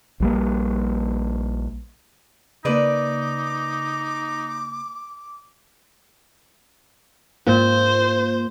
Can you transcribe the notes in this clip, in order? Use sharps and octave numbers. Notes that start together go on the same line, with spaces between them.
A#1 G3 A#3
C#3 A#3 D#4 B4 D5 D6
G#2 A#3 F4 C5